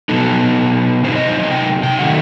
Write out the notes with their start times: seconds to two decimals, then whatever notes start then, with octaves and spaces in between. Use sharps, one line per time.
0.09 B2 F#3 B3 D#4 A4
1.04 C3 F#3 C4 D#4 C5
1.16 D#5
1.28 C5
1.40 D#5
1.51 G5
1.83 G5
1.99 D#3 F#3 A3 D#4 F#5